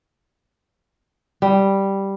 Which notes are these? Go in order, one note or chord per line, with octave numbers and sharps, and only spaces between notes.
G3